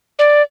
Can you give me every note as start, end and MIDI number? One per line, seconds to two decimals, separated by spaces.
0.19 0.42 74